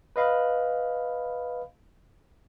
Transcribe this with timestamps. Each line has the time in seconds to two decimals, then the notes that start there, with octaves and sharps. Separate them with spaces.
0.16 B4 D#5 F5 B5